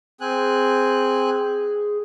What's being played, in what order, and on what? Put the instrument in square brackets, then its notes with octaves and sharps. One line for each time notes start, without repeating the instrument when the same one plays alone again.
[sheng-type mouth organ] C4 G#5 F#6 [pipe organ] G#4